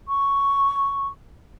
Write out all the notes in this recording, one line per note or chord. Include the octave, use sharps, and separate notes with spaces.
C#6